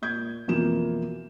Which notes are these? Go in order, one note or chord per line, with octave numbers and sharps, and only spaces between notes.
A#2 G6 G#6
F2 B2 E3 A#3 F4 E7